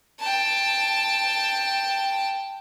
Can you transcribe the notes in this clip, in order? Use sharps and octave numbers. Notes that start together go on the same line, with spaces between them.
G5 A5